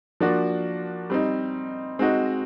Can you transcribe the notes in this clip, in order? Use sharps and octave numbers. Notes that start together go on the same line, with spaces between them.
F3 A#3 D4 F#4
G3 C4 D#4
G#3 C4 D#4 F#4